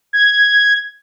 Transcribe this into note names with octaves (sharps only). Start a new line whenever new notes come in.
G#6